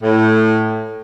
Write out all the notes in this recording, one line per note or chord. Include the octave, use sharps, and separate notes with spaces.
A2